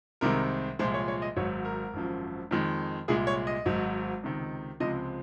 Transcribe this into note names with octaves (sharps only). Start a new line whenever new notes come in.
C2 C3 D#3 G#3 A#4
C2 A#2 F3 G#3 C5
C#5
C#5
D#5
G#1 G#2 F#3 C#5
A#4
G#1 F#2 F3
F2 D#3 G#3
C2 A#2 G#3 G#4
C#5
D#5
G#1 G#2 F#3
C#2 C3 D#3
C#2 C3 F3 G#3 D#5